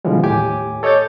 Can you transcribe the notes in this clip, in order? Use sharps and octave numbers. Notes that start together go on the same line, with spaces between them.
B2 D3 E3 F3 G3 G#3
D#2 A2 G4 G#5 D6
A4 C#5 D#5 D6 G6 A6